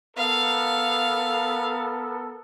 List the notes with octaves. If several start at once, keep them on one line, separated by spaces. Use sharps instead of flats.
B3 A4 A#4 F5